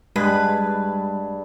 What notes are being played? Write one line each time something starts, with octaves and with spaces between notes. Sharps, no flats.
G2 G3 G#3 B4